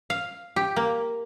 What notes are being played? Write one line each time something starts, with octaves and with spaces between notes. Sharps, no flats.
F5
G4
A#3